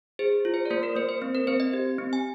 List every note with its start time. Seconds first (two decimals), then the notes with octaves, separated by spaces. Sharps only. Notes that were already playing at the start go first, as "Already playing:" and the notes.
0.19 G#4 C5
0.45 F4
0.54 C5
0.65 D5
0.70 A#3 C5
0.83 A#4
0.96 A#3 C5
1.09 C5
1.22 C4
1.35 A#4
1.47 C4 C5
1.60 D#5
1.73 G4
1.99 C4
2.13 G#5